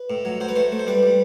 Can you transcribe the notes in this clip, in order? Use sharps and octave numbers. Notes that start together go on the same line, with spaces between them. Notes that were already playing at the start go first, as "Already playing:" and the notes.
Already playing: B4
A2
F#3
F#3 C5
B4
A3 C5
A3
C5
G3 B4
G3